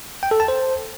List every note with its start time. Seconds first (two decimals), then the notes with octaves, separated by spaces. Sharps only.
0.23 G5
0.31 A4
0.40 A5
0.48 C5